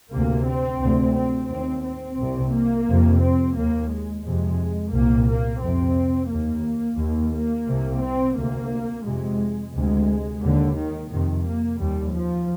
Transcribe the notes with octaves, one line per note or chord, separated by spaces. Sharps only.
D2 C3 A#3
C4
D2 C3
C4
D#2 C4
C4
C2 C3
A#3
F2 C3
C4
D#2 A#3
G#3
F2 C3 G#3
C2 A#2 A#3
A#3
F2 C3 C4
D#2 A#3
D#2
A#3
C2 C3
C4
D2 C3 A#3
F2 C3 G#3
D2 C3 G#3
D#2 D3
D#3
F2 C3 D#3
A#3
D#2 G3
F3